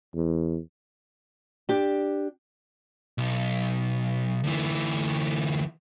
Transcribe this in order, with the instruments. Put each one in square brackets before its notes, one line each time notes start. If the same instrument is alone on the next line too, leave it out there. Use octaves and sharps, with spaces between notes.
[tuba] E2
[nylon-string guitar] D4 G4
[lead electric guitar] B1
D2 E3